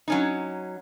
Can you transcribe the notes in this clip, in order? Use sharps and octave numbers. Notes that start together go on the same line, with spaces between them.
F#3 C#4 D#4